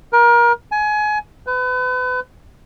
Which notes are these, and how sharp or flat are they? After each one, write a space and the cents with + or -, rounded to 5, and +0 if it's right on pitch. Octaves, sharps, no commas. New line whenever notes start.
A#4 +30
G#5 +25
B4 +35